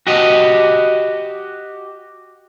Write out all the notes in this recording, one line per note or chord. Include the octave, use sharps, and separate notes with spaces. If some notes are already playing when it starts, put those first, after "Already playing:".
F#4 G4 D#5